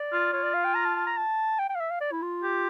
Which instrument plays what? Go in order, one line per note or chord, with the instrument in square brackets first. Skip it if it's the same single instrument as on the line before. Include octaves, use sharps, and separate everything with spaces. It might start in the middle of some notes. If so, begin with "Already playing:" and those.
Already playing: [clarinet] D5
[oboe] F4
[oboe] F4 [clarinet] C#5
[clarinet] D5
F5
G5
A#5
A5
A5
A#5
A5
G5
G5
F5
E5
F5
D5
E4
F4
[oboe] G4